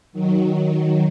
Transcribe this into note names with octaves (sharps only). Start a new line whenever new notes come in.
D#3 F#3